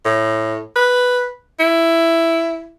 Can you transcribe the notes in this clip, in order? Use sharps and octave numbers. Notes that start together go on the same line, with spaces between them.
A2
B4
E4